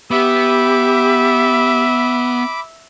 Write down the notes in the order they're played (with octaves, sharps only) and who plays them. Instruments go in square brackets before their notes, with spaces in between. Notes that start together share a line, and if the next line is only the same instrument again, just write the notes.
[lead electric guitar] B3 [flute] G4 [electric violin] E5 [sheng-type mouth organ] B5 D6